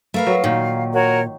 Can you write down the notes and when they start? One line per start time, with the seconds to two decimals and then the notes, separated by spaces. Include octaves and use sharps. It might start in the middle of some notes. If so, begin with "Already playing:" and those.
0.14 A3 A#4 B4 F5
0.27 F#3
0.44 A#2 D#3
0.93 F#4 A#4 C#5